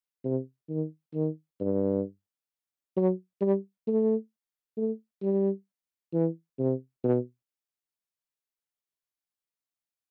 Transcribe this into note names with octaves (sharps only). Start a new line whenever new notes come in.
C3
D#3
D#3
G2
F#3
G3
A3
A3
G3
E3
C3
B2